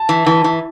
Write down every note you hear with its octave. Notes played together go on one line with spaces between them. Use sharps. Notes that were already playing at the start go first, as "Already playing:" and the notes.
Already playing: A5
E3
E3
E3